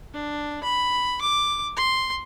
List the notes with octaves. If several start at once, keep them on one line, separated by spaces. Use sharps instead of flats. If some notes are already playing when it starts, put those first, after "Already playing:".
D4
B5
D6
C6